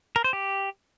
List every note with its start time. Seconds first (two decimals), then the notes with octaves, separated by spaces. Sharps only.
0.16 A#4
0.24 C5
0.33 G4